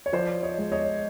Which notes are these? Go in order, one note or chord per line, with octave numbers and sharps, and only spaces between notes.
C#5
F3 C5 D5
C#5 D#5
G#3
C#5 D#5